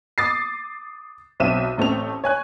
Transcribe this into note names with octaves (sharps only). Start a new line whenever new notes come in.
D6 D#6 A6 C7
B1 C4 E5 D#7 E7
A1 A3 C4 F7
C#5 G#5 F#6